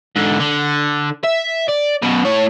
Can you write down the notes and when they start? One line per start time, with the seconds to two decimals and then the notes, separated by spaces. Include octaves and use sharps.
0.16 G#2 D3
0.40 D3
1.24 E5
1.68 D5
2.02 F#2 B2
2.25 A2 C#5